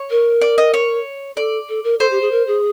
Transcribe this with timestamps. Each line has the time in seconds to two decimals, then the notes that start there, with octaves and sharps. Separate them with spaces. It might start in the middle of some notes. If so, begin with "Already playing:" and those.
Already playing: C#5
0.10 A#4
0.41 D5
0.58 D#5
0.74 C#5
1.36 A4 D5
1.69 A4
1.84 A#4
1.99 A4 C5
2.11 G4
2.21 G#4
2.31 A#4
2.47 G#4